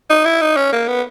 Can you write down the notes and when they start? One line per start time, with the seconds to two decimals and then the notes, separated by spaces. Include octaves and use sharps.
0.10 D#4
0.25 E4
0.41 D#4
0.57 C#4
0.73 A#3
0.88 B3